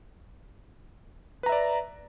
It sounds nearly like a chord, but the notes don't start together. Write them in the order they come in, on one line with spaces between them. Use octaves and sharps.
B4 A#5 E5 D5